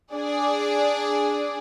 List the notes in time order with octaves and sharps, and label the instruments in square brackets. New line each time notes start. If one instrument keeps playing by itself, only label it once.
[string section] D4 G#4 D5